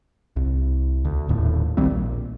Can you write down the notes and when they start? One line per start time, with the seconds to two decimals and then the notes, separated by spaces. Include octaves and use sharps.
0.36 C2
1.05 D2
1.29 D#1 D#2 A2
1.77 B1 D#3 G3 C4
1.91 A#1